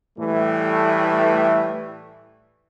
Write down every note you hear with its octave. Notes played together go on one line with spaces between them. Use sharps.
A2 E3 G3 A3